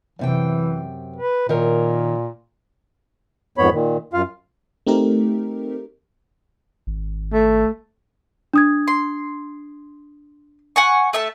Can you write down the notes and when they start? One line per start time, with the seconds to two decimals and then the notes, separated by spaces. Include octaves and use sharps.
0.19 F#2 C3 E3 G5
1.16 B4
1.49 A#2 D#3 A#4 C#5
3.58 F2 G#2 B3 C#5 B5
3.72 A#2 D#3
4.13 F#2 F4 F5
4.87 A3 C4 D#4 G4 A#4
6.87 G#1
7.33 A3
8.53 D4 D#6 G#6
8.88 C6
10.76 F#5 G#5 C#6
11.13 A3 E5 A5